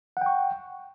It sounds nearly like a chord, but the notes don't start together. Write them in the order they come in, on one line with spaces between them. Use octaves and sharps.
F#5 G5 C#6